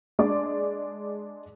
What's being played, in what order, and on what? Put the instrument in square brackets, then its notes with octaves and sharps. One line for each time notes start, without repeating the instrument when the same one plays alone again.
[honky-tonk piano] G#3 D4 D5 D6